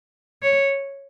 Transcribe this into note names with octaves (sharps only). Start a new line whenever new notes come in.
C#5